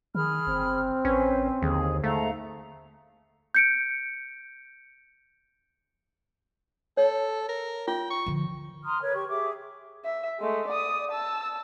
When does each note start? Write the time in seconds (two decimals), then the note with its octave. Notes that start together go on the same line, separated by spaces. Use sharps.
0.15 D#3 G#4 B5 F6
0.47 G1 C4
1.05 A1 C#4 B4 C5
1.62 D#2 D3 G#4
2.04 G#2 A3 F5 F#5 A#5
3.55 G6 C#7 D7
6.97 A4 C#5
7.49 A#4
7.88 F4 G5
8.10 C#6
8.26 D3 F3
8.84 A#5 C6 D#6 F6
9.01 A#4 B4 C#5
9.14 G4 C#6
9.29 G4 G#4 E5 D6
10.05 E5
10.39 G#3 A3
10.68 D5 D#6
11.12 A5 E6